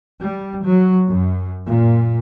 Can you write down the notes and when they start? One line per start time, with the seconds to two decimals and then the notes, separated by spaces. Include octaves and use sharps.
0.21 G3
0.66 F#3
1.08 F#2
1.66 A#2